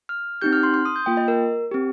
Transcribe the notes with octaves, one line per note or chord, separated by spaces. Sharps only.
F6
C4 D#4 G4 G6
F6
C6
C6
D#6
G6
A#3 F4 G5
D#5
A#4
C4 G4